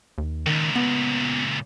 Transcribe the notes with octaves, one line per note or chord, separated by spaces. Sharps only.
D#2
C#2 A#2 D#3
B3